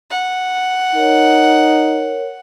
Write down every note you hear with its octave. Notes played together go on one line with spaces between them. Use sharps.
F#5
D#4 A#4 C#5